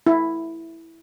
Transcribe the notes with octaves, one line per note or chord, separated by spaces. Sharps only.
E4